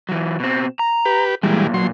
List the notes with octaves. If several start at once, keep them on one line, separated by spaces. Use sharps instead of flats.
E3 F#3
B2 C4
A#5
G4 B4
B1 A#2 E3 G3 G#3
F#3 C6